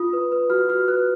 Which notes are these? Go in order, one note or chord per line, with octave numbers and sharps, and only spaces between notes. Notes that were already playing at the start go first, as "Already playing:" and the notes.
Already playing: F4 D#6
B4
B4
F#4 F6
F#4 F6
B4 F#6